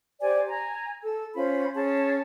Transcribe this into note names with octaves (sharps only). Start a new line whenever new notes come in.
G4 C5 D5 G#5
G#5 A#5
A4 E6
C#4 F4 C5 B5
C#4 G#4 A5